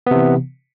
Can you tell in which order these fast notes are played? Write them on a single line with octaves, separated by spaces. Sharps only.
B3 C3 E3